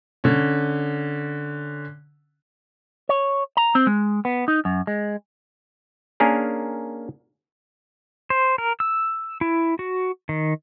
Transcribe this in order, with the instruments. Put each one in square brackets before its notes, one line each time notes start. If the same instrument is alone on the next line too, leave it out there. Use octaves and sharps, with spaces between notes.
[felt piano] D3 C#4
[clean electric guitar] C#5
A#5
C4
G#3
B3
D#4
F#2
G#3
[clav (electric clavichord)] A#3 C#4 D4 G#4 A#4
[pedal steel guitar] C5
A#4
E6
E4
F#4
D#3